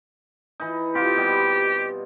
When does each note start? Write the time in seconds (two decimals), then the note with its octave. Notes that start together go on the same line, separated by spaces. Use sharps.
0.60 E3 D#4
0.95 C3 F4 G4 C6
1.17 B2 G3